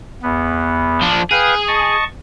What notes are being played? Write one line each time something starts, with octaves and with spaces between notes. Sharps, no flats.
E2 B3
F3 D4
G#4 B4 F5 G5
D#5 A5 C#6